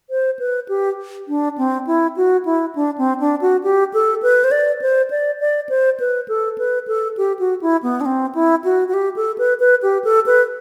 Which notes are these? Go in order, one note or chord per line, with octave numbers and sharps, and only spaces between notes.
C5
B4
G4
D4
C4
E4
F#4
E4
D4
C4
D4
F#4
G4
A4
B4
C5
D5
C5
D5
D5
C5
B4
A4
B4
A4
G4
F#4
E4
B3
D4
C4
E4
F#4
F#4
G4
A4
B4
B4
G4
A4
B4